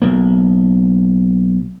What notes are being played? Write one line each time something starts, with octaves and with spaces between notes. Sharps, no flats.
B1 A#3